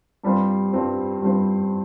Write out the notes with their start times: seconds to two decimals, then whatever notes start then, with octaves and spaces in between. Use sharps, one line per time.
0.24 G2 G3 C4 F4 C5
0.72 G2 G3 C4 F4 C5
1.21 G2 G3 C4 F4 C5